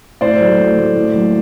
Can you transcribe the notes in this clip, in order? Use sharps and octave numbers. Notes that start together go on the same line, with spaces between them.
A2 C5 D5
F#3 A3
A2
F#3 A3
A2
F#3 A#3